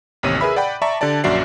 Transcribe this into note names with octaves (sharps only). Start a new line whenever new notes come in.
A1 D#2 C3 C#5 D#7
G#4 A#4 B4 E5 B5 E6
D5 F#5 G5 B5
D5 E5 A5 A#5 C#6
D3 G4 D5 A5
A#1 F#2 F#4 D5 E5 C7